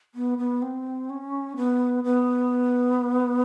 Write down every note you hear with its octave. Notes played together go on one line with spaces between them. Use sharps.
B3
B3
C4
C#4
B3
B3